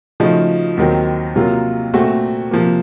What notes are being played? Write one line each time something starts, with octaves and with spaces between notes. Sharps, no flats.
C#3 F3 A3 D#4 F#4
D#2 D#3 F#3 C4
C3 F#3 A#3 F4
A#2 A3 C4 F#4
C3 F3 A#3